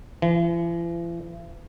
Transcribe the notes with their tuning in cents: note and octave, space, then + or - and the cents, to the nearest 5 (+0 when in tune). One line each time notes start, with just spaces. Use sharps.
E3 +45